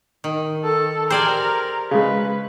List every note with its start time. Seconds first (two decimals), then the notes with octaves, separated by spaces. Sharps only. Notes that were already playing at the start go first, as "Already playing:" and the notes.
0.24 D#3
0.64 A4
1.10 G4 G#4 A#4 C5 D5 G5 G#5
1.91 C#3 G#3 G#4 B4